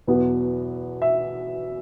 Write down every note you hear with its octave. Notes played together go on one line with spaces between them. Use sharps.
E2 B2 F#3 B3
E5